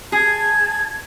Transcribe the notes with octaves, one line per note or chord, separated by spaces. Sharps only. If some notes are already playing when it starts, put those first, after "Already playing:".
G#4 A5 G#6